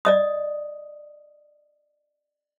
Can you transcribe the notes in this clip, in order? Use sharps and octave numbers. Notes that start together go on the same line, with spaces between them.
D5 D#5 D#6